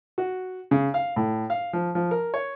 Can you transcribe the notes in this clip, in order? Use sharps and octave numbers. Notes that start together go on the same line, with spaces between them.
F#4
C#3
F5
A2
F5
F3
F3
A#4
C#5